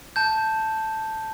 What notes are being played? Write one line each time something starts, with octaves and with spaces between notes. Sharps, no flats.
A5 G6